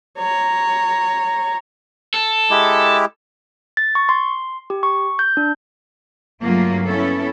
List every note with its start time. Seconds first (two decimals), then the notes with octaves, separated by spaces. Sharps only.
0.18 C#5 A#5
2.14 A4
2.50 G#3 E4 G4
3.77 A6
3.95 C#6
4.09 C6
4.70 G4
4.83 C#6
5.19 G6
5.37 D4
6.42 G2 C#3 F#3 A3 A#3 F4
6.85 B3 C#4 E4 A4